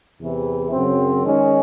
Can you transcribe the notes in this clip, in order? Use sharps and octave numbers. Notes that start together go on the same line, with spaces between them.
E2 C3 E3
F#2 C#3 F#3 C4
D#3 G#3 C#4